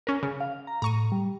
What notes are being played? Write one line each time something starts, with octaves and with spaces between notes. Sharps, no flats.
C#4 A#4
C#3
F5
A#5
A2 A#5 C#6 D#7
G3